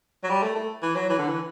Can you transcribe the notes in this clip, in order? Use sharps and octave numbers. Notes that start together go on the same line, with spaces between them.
F#3
G3
A3
A3
E3
F#3
E3
D3
E3